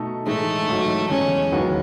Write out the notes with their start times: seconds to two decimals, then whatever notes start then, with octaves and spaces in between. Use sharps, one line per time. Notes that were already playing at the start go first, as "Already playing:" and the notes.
Already playing: B2 A3 D#4 A4
0.27 A2 E3 G#3 A3 D#4
0.68 A1 G#2 F#3
1.10 E2 C#3 G#3 C#4
1.52 E1 D#2 D#3 F#3 B3